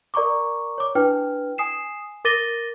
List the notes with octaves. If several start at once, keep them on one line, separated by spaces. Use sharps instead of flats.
A#4 D5 A#5 C#6 D6
C#5 D6
D4 E4 B4 G5 F6
G#5 D#6 C7 E7
A#4 D6 A6 A#6 D#7 G7